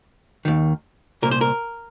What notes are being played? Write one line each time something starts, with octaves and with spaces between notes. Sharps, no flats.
D#2 D#3
C2 A#2 A#4
C5
A#4